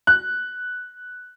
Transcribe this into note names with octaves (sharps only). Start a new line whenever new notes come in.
F#6